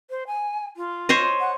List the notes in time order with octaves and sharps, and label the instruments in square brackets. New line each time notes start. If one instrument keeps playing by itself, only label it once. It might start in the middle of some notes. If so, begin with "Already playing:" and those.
[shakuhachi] C5
G#5
F4
[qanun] C5 C#5 D#5
[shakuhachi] F#5